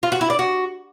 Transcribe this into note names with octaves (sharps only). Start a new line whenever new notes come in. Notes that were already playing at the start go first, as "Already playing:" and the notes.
F4
F#4
E4
D5
F#4